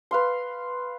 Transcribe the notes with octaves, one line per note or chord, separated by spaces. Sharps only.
B4 F5 C6